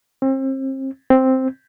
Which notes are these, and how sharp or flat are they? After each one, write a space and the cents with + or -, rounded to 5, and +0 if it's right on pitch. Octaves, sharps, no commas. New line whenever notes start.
C4 +35
C4 +0